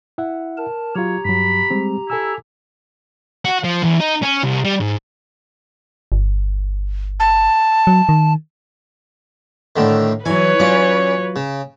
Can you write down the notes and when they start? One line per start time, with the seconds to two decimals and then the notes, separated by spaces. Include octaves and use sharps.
0.18 E4 E5 F#5
0.57 A#4 A5
0.95 F#3 F4 G4 C#5 A#5
1.25 G2 F#3 B5
1.70 G3 G#3 C4
2.10 E4 A4 G#5 E6
3.45 F#4
3.64 F3
3.82 E2
4.00 D#4
4.22 C#4
4.44 C2
4.65 G3
4.81 G#2
6.12 G1
7.20 A5
7.87 F#3
8.09 D#3
9.76 A2 D3 D#3
10.26 E3 F#3 B4 C#5 G#5
10.60 F#3 C#4 F4 D5
11.36 C#3